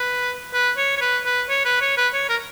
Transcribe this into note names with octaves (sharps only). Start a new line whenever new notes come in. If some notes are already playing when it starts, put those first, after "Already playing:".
Already playing: B4
B4
C#5
C#5
B4
B4
C#5
B4
C#5
B4
C#5
A#4